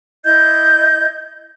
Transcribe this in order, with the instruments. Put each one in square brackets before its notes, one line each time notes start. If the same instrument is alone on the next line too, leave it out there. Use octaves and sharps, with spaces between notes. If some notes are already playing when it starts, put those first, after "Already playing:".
[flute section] E4 D#5 G6 G#6